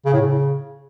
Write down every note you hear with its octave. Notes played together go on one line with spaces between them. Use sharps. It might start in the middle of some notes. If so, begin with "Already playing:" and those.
C#3
A2
C#3